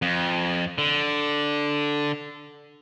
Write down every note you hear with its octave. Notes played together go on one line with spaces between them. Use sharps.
F2
D3